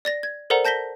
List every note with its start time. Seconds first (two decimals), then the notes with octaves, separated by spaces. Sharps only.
0.05 D5 A6 A#6
0.23 G#6
0.50 A4 A#4 C5 D5 F#5 A#5
0.65 A5 G6 A#6 B6 G7